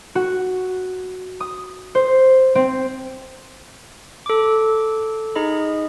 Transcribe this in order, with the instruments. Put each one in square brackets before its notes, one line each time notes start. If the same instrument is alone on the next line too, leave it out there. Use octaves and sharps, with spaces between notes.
[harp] F#4
D#6
C5
C4
[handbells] A4 D6
D#4 G#4 D#5 B5